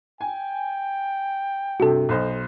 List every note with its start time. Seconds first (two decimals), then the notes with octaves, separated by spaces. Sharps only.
0.21 G5 G#5
1.80 G2 C3 F#4 A4
2.09 B1 C5 D#5